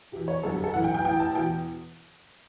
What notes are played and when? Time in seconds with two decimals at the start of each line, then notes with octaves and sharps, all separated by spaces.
0.12 E2 B2 G4
0.28 C#5
0.43 G1 F#2 D3 A4
0.54 G4
0.64 A4
0.73 B1 A2 E3 F#5
0.84 G5
0.94 G5
1.05 A1 A2 E3 G5
1.20 A5
1.35 E2 B2 G5